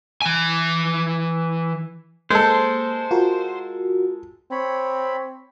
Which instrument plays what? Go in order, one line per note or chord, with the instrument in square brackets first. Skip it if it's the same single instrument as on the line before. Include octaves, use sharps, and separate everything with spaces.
[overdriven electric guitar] E3 G#5
[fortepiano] G#3 A4 [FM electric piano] A#3 [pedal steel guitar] C5
[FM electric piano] F4 F#4 A#4
[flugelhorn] C4 [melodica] C#5 B5